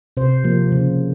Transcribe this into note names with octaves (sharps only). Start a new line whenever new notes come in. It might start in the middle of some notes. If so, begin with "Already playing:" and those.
C3 C5
F3 A#3
C#3